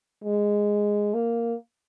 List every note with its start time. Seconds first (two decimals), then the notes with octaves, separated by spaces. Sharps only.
0.24 G#3
1.14 A#3